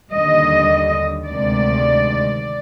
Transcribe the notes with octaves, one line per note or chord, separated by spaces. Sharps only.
D#2 D3 G3 D#5
D2 C3 D#3 G#3 D5